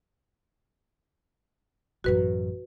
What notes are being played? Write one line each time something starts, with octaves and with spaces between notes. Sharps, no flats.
A1 F#2 F#4 B4